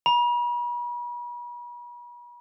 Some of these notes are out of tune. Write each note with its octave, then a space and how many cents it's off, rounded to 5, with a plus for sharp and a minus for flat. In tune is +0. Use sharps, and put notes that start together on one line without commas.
B5 -40